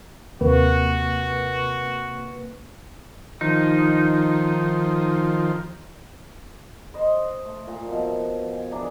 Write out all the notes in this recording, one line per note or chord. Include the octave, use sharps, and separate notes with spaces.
D#2 C3 A#3 F#4 B4
D#3 F3 D#4
C5 D#5
A3
A#2
B2 F3
G#5
E3 D4 G#4 A#4